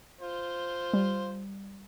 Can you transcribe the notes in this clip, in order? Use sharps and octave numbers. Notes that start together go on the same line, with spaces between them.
F4 C5
G3